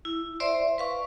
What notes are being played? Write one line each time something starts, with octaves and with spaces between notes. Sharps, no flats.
E4
C5 D5 E5 C6
B4 F5 C#6